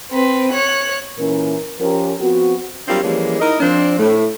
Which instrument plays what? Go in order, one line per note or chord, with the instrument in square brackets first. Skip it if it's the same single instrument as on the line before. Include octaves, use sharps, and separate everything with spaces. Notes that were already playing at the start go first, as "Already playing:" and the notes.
[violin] C4 B4
C#5 F#6
[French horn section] A#2 E3 C#4 A#4
F3 C#4 G4 A#4
F3 B3 C4 F#4
[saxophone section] F#3 G3 A#3 C4 D4 F4
E3 F3 G3 G#3 A#3 C#4
D#4 E4 A#4 D#5
F3 C4 D4
A2 A3